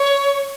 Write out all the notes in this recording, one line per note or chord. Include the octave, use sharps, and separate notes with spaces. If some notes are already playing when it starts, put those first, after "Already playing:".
Already playing: C#5